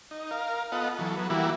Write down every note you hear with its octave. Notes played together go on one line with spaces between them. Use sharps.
D#4
A#4 F5
B3 F4 A4 D#5 F#5
E3 F#3 A4
F#3 B3
E3 G3 A#3 E4 F#4